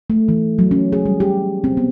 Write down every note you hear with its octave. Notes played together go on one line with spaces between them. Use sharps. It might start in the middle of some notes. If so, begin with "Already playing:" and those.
A3
E3
F#3
C#4
G#4
G3
G4
C4
B3